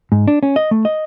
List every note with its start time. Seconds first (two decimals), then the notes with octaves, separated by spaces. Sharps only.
0.12 G#2
0.28 D4
0.43 C#4
0.56 D#5
0.71 A3
0.85 D#5